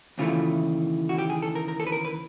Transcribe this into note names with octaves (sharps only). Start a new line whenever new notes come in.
D#2 C#3 E3 A3 F4
F#4
G4
G#4
A4
A#4
A#4
A4
B4
A#4
B4